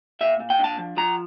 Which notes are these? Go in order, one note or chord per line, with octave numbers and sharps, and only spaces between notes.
A#2 E5
A#2
G5
D4 A5
F3
F3 A#5